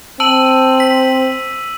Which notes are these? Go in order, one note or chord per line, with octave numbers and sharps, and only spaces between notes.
C4 A5 E6 D#7 F#7
B6